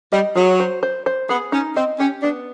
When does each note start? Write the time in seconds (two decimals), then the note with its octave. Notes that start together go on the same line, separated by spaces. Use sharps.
0.12 G3 D#5
0.36 F#3 G#4
0.60 C5
0.83 C5
1.06 C5
1.29 B3 G#4
1.52 C#4 D#4
1.76 C4 D#5
1.99 C#4 G4
2.23 B3 D4